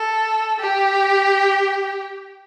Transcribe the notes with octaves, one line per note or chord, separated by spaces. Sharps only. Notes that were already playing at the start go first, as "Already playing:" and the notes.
Already playing: A4
G4